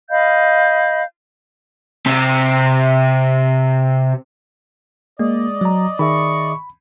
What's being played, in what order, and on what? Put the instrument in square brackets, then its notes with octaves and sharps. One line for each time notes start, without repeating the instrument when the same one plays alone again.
[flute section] D#5 F5 B5 G6
[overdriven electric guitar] C3 C4
[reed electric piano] G#3 [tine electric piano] A#3 [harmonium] D5 D#5
[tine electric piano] F#3 A#5
[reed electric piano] D#3 G#4 E5 [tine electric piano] B5 [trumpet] C#6